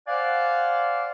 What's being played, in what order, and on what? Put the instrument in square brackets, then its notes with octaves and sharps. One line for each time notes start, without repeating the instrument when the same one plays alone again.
[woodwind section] C5 D5 F5 F#5 G#5 D6